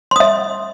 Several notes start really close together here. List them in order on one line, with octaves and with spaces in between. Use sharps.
C6 D#6 E5